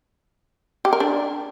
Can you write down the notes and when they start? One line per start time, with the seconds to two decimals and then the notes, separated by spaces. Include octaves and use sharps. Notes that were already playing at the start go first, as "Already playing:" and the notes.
0.85 G4
0.93 A#4
1.00 D4